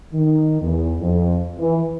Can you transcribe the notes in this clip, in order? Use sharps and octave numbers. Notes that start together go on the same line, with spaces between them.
D#3
E2
F2
E3